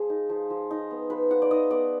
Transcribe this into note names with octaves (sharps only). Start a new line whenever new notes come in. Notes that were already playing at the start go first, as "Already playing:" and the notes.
Already playing: F3 G#4
D#4
F3
F3
D#4
B3
F3 B4
F3 F#5
D5
D#4 D#5
B3 D5